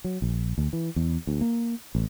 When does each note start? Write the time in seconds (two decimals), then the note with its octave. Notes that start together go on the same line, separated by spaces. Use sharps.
0.04 F#3
0.22 A#1
0.58 D2
0.73 E3
0.96 E2
1.27 D2
1.41 A#3
1.95 A1